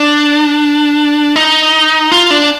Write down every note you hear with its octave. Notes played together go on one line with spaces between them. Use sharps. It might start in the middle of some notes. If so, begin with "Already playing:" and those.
Already playing: D4
D#4
F4
D4